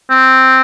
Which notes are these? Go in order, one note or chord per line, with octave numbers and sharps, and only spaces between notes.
C4